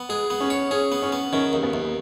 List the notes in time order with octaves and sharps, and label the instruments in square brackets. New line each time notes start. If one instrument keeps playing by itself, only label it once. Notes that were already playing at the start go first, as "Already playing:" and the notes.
Already playing: [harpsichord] B3
[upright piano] G#3 [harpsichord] G#4
[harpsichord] B3
[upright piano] C#4
[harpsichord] C#5
[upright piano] C#4 [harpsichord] G#4
[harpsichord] B3
[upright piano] C#4
[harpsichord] B3
[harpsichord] D#3 [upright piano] C#4
[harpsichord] D#2
[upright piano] B3
[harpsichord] D#2